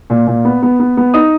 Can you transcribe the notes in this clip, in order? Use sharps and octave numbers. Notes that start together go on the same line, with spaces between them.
A#2
A#2
B3
B3
B3
B3
D#4 D#6